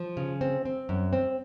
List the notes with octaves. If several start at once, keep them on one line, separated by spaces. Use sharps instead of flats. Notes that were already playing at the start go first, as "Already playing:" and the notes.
Already playing: F3
C#3
C4
C4
F#2
C4